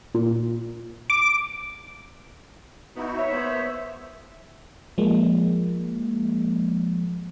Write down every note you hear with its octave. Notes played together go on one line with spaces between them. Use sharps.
A#2
D6
B3 D#4 E4 F#4
C#5 E5
A#3 B3 C5 C#5
F3 G#3 A#3